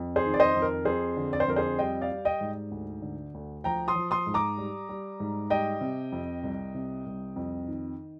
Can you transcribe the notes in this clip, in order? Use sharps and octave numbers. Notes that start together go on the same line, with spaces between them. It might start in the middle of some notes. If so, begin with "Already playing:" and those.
Already playing: F2
G#4 C5
D#3
D5
C5 D#5
F2
A#4
F2 G#4 C5
D3
D5
C5
F2 A#4
G#4 C5
G3 D#5 G5
D5 F5
G3
D#5 G5
G#2
D2
D3
D2
F3 G5 A#5
C6 D#6
F3
C6 D#6
G#2
A#5 D6
G3
G3
G#2
G3 D#5 G5
C3
F2
C2
C3
C2
F2
D#3